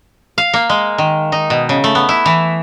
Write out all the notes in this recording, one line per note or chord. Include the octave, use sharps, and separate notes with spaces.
F5
A#3
G#3
D#3
D#4
B2
C#3
A3
B3
E4
E3